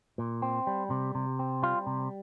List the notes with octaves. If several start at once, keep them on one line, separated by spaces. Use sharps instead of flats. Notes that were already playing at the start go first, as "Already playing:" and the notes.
A#2
C4
G3
C3
C3
C4
G3 F4
C3